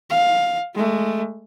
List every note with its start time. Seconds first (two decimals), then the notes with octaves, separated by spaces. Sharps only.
0.10 F5
0.75 G#3 A3